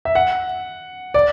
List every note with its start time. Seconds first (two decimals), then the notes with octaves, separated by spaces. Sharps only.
0.05 E5
0.15 F#5
1.14 D5